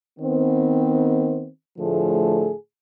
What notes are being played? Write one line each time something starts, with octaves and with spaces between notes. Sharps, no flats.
D#3 B3 C4
A2 D3 F3 A3 G#4 A4